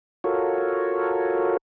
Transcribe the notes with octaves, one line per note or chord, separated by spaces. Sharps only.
F4 F#4 A4 A#4 C#5